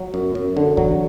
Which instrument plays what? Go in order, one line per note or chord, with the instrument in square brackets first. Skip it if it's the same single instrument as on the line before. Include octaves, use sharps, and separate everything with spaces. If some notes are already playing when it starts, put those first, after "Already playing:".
Already playing: [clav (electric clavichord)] F#3
F#2
F#2
D3
[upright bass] E3 [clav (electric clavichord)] F#3